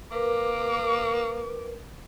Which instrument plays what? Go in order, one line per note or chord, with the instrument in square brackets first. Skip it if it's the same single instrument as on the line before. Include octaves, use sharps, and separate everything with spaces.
[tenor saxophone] A#3 [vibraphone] A#4 B4 [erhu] D6